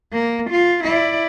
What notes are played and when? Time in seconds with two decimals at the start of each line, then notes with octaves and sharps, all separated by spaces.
0.13 A#3
0.50 F4
0.84 E4 D5